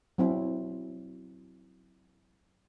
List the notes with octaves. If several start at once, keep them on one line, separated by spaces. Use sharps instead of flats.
F#3 C4 E4